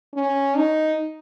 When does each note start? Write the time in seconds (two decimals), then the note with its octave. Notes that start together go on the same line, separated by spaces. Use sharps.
0.14 C#4
0.57 D#4